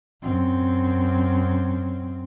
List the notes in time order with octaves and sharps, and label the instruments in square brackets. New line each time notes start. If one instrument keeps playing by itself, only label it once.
[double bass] F#2 C4